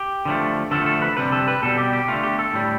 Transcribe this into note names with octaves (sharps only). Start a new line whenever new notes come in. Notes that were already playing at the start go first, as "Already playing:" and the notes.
Already playing: G4
D3 F3 A3
D3 F3 A3 A4
A4
B4
C3 G3 B4
A4
B4
B2 G3 A4
G4
G4
D3 A3 F4
G4
A4
A2 G3